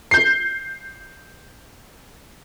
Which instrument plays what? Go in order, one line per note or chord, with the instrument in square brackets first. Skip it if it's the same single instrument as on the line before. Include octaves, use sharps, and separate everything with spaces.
[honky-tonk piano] G6 C7